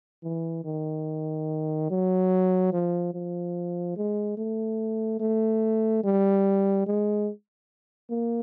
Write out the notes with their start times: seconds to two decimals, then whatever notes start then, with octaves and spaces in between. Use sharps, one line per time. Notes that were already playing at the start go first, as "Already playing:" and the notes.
0.24 E3
0.65 D#3
1.90 F#3
2.73 F3
3.14 F3
3.97 G#3
4.37 A3
5.20 A3
6.04 G3
6.86 G#3
8.10 A#3